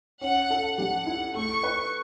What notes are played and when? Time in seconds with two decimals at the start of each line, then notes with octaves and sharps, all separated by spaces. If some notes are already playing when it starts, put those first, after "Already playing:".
0.21 C#4 F#5
0.50 A4
0.78 G3 F#5
1.06 E4
1.35 A3 C#6
1.63 B4